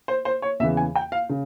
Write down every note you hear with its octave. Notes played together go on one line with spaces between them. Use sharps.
C5
C5
C#5
E2 C#3 E3 E5
G#5
G5
F5
C#3